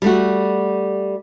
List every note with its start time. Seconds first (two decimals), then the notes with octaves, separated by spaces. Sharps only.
0.02 G3 A3 F#4